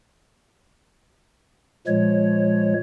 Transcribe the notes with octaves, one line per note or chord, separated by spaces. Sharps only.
A#2 F3 G#3 C#5